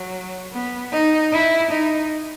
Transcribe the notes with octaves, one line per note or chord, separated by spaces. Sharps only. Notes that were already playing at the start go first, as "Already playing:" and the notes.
Already playing: F#3
B3
D#4
E4
D#4